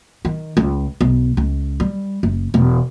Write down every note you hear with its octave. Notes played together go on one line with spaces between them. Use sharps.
D#3
C#2
B1
C#2
G3
F#1
E1